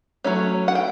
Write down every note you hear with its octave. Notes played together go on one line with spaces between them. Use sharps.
F#3 A3 C#4
F#5
G5